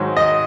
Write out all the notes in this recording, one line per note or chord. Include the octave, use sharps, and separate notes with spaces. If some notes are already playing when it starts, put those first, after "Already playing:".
Already playing: G#2 D#3 F#3
D#5